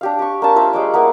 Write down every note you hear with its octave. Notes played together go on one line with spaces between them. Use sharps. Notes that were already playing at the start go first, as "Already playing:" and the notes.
D4 G4 F5
G4 C#6
A#3 D4 A5
F4 C5 E5 A#5
G#3 C#5 D5
A#3 B3 E4